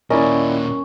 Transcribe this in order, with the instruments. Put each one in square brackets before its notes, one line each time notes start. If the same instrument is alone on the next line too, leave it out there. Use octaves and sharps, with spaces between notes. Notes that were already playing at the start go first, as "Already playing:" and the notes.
[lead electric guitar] D#2 A#2 [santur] C#4 [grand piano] E4 D5 D#5 [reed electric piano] A#4